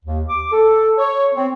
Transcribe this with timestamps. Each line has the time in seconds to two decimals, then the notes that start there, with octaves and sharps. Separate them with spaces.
0.04 D#2
0.29 D6
0.52 A4
0.98 C#5
1.35 C4